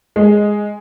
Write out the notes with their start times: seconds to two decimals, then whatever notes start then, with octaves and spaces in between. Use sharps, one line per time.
0.16 G#3